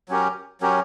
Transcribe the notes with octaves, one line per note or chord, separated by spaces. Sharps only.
F#3 C#4 G4 A#4
F#3 C#4 G4 A#4